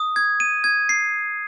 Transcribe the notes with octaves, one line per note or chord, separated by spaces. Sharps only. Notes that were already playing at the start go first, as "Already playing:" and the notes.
Already playing: D#6
G#6
D#7
G#6
C7